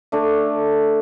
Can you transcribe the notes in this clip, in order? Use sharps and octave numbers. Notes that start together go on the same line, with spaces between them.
A3 D4 A4